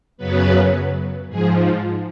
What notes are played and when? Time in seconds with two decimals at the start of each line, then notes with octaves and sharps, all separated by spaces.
0.17 F#2 C#3 F#3 B3 B4
1.28 G#2 F3 G#4